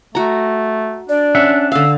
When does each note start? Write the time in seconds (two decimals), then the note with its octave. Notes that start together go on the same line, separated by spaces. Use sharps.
0.15 A3 F#4 A#5
1.09 D4 D5
1.35 C#4 E5 F#5
1.72 D3 F5 E6